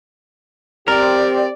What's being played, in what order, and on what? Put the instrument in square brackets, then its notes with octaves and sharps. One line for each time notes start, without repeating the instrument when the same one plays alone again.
[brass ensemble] C4 G4 [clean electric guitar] A#4 [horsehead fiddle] D5